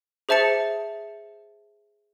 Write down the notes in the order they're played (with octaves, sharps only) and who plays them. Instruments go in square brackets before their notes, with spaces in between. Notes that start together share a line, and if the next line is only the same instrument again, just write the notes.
[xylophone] G#4 C5 E5 A5 A6 C#7